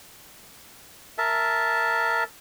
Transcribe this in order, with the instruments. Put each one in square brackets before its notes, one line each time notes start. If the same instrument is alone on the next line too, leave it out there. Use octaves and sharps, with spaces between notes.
[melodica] A#4 E5 A5